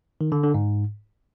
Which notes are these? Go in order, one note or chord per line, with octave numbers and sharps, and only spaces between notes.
D#3
D3
D3
G#2